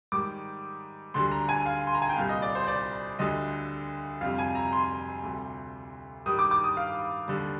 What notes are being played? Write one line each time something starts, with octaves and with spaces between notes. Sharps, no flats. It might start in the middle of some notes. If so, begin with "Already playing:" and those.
G#2 D#3 G3 D6
D2 D3 G3 C6
A#5
G#5
F5
C6
A#5
G#5
G5
C2 A#2 G3 F5
D#5
D5
C5
D5
D2 D3 G3 D#5
F2 C3 G3 F5
G#5
A#5
C6
D2 C3 G3
G2 D#3 G3 D#6
D6
D6
D#6
F5
D#2 D3 G3